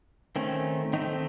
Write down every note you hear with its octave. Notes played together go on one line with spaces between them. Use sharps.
D#3 A3 C4 C#4
D#3 A3 C4 D#4